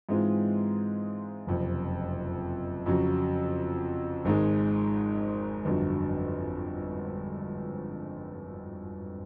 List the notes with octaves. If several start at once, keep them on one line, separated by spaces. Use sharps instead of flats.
G#2 E3 G#3 C4 F4
F#1 F2 C3
F2 C#3 F#3
G#1 G#2 D#3 G#3
G1 F2 D3 F#3